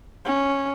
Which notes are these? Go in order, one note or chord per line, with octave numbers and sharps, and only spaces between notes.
C#4